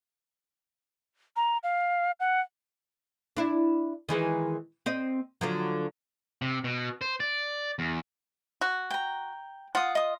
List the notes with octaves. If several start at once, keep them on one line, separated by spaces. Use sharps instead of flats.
A#5
F5
F#5
D4 E4
D#3 E3 G#3
C4 D#5
D3 F3 F#3
C3
B2
C5
D5
E2
F#4
G5 A#5
F4 F#5 D#6
D#5 D#6